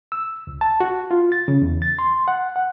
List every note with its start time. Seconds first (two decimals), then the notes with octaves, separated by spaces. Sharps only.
0.12 E6
0.47 C#2
0.61 A5
0.80 F#4
1.11 F4
1.32 A6
1.48 C#3
1.62 E2
1.82 A6
1.99 C6
2.28 F#5
2.56 F#5